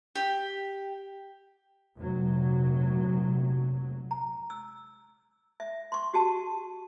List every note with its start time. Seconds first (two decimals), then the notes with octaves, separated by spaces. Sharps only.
0.16 G4
1.96 F1 A#1 F#3
4.11 A#5
4.50 E6
5.60 E5
5.92 C6 C#6
6.14 F#4 G4 A5